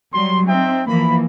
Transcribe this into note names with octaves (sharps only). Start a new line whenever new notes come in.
F#3 G3 C6
C4 D#4 E5 G5
E3 F3 A#3 B5